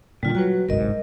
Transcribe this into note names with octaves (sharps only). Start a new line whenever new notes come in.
A#2 D3 G3 F4
F#3 F#4 B4
G1 C2 G#2 A#4 D#5